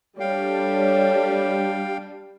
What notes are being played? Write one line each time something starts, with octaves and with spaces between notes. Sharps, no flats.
G3 D4 A4 C#5 F5 G5